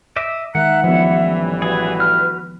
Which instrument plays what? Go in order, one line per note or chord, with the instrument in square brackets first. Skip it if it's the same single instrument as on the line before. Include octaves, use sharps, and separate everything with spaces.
[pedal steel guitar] D#5 E5 D6
[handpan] D#3 G#3 [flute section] E5 A#5 F#6 [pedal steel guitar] F#5
[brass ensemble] A1 E3 G3 [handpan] F3 B3 [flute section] E5
[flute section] F#4 B4 [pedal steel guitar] G#4
[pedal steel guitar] F6